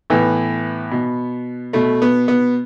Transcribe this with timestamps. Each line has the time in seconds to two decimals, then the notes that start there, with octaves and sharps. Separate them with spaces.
0.10 A2 E3 B3
0.91 B2
1.73 B2 A3
2.02 B3
2.28 B3